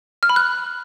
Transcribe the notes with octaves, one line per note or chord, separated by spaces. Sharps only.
F6
B5
F#6